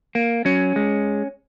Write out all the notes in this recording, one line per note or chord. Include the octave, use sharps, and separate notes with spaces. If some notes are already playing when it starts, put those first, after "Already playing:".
A#3
F#3 C#4
G#3